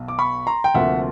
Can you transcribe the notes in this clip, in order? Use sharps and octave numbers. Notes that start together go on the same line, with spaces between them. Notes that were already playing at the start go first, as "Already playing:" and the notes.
Already playing: B1 B2
D6
B5 C#6
A#5 C6
G5
D2 C3 F3 A#3 E5 F#5